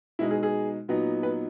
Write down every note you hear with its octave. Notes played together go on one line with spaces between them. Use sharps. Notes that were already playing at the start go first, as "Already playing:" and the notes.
B2 G#3 D#4 E4
G#4
G#4
A#2 F#3 B3 D#4
B4